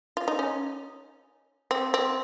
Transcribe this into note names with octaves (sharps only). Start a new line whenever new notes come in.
F4
D#4
C#4
C4
C4